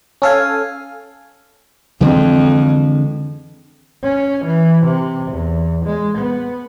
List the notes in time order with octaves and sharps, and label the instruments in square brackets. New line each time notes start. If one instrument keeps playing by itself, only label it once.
[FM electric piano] C#4 A4 F5 G#5
[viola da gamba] F2 [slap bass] D3 E3 G#3
[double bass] C#4
E3
C3
E2
G#3
B3